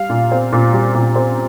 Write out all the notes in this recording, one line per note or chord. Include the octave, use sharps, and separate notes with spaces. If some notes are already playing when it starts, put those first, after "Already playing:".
Already playing: G3 F5
A#2
C4
A#2
G3
A#2
C4